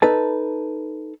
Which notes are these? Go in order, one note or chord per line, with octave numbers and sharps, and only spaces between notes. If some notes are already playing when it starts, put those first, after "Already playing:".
D#4 A4 B4 A5